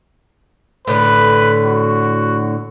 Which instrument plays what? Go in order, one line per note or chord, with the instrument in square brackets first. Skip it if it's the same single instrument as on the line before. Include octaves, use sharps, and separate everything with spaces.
[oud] A2 D3 [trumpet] B4
[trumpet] F#4